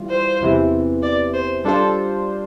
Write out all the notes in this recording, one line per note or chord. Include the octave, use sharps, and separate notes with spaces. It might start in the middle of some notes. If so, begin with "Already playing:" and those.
Already playing: E3 G3 F4
C5
E2 C3 E3
D5
C5
G3 D4 F4 A4 C5